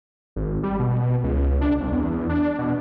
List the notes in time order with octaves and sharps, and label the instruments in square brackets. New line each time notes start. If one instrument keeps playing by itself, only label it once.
[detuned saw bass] G#1
G3
B2
C#2
D4
C2
E2
D4
B2